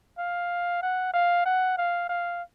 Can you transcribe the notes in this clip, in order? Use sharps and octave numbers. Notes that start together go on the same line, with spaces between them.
F5
F#5
F5
F#5
F5
F5